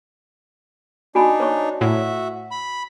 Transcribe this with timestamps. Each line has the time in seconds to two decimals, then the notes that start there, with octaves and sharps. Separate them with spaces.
1.15 D4 D#4 F#4 G#5 B5
1.40 C5 C#5 C#6
1.81 A2 F#4 E5
2.51 B5